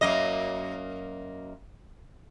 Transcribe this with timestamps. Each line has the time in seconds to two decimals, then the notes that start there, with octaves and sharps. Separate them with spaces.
0.01 F#2 A#3 D#5